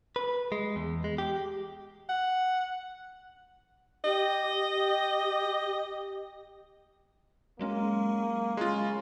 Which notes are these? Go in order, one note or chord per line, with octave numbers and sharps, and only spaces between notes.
B4
G#3
E2
G#3
G4
F#5
G4 D#5
G4
F#3 G#3 A#3 C#4
C#3 G#3 F4